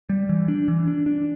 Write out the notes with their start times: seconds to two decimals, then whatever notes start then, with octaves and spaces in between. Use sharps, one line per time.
0.09 G3
0.29 E3
0.48 D4
0.68 E3
0.87 D4
1.06 D4